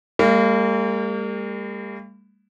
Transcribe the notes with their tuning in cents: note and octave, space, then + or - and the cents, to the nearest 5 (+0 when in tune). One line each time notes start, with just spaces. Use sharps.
G3 +40 A#3 -35